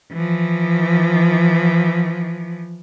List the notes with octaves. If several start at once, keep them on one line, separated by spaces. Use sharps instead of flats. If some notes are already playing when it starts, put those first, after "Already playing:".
E3 F3